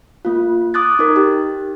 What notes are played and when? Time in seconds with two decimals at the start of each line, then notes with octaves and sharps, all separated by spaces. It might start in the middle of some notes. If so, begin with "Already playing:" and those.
0.25 A#3 F4
0.74 D6 D#6 F#6 A6
0.99 D#4 A#4
1.16 G4